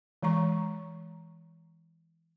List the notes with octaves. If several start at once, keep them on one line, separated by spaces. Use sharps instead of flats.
E3 G#3 A#5 C#6